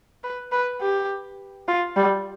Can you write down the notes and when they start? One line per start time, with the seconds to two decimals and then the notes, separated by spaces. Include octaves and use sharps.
0.24 B4
0.52 B4
0.81 G4
1.68 F4
1.97 G3